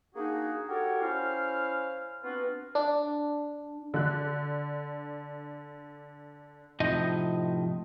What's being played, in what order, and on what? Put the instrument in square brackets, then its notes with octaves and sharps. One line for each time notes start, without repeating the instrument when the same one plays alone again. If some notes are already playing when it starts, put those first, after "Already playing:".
[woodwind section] A#3 D4 D#4 F#4 G#4
F#4 G4 A4 A#4 C#5 G5
C#4 E4 C5 F5 F6
B3 C4 D4 F4 F#4 B4
[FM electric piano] D4
[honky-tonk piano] D3 D4 F#6
[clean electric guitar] A2 C3 F3 D#4 D#5